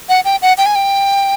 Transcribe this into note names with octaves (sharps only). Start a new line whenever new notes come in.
F#5
G5
F#5
G5
G#5
G5